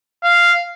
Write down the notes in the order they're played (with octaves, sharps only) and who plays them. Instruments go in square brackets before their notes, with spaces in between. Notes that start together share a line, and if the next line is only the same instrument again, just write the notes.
[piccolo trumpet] F5